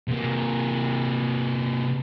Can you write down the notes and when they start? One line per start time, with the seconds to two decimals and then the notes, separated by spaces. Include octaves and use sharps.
0.08 C3 A#3